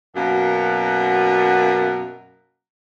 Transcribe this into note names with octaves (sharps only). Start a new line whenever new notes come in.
F#2 B2 A#3 A#4 F#5